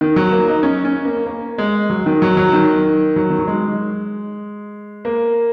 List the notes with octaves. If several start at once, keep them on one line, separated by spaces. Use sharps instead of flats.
D#3
F#3
A#3
D#4
C#4
C#4
A#3
A#3
G#3
F#3
D#3
F#3
F#3
D#3
F#3
D#3
F#3
G#3
A#3